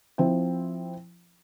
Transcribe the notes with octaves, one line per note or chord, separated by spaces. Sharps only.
F3 C4 E4 G5